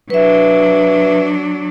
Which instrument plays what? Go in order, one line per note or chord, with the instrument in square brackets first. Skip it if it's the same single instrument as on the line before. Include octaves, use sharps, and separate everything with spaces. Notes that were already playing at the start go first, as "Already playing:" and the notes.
[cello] F#3 D4 [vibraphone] B4 E5